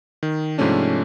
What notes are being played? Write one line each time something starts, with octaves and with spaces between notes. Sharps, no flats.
D#3
G#2 C3 F3 A3 C#4 D4